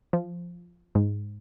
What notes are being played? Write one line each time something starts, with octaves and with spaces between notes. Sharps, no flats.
F3
G#2